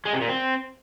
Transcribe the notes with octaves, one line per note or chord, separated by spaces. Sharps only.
G#3
C3
A#2
C4